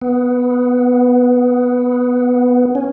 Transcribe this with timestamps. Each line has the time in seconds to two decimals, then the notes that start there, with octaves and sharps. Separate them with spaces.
0.02 B3
2.75 C#4